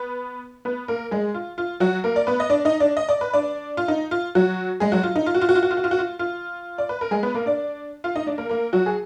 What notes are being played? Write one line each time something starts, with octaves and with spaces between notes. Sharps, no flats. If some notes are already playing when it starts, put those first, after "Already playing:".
Already playing: B3 B4
B3 B4
A#3 A#4
G#3 G#4
F4
F4
F#3 F#4
A#3 A#4
D5
B3 B4
D#5
D4 D5
D#4 D#5
D4 D5
D#5
D5
B4
D4 D5
F4
D#4
F4
F#3 F#4
G#3 G#4
F#3 F#4
F4
D#4
F4
F#4
F4
F#4
F4
F#4
F4
F#4
F4
F#4
F4
F4
D5
B4
A#4
G#3 G#4
B3 B4
A#3 A#4
D4 D5
F4 F5
D#4 D#5
D4 D5
A#3 A#4
A#3 A#4
F#3 F#4
G#4